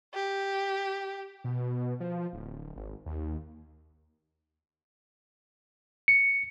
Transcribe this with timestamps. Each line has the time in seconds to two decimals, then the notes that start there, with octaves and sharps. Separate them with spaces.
0.14 G4
1.44 B2
2.00 F3
2.33 D1
2.76 G#1
3.06 D#2
6.08 C#7